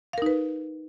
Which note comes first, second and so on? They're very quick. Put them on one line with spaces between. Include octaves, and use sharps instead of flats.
F5 A#4 D#4 B4